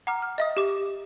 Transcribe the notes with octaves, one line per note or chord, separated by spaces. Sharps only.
F#5 A#5 D6 F6
F6
D#5 E5 D#6
G4 D6 E7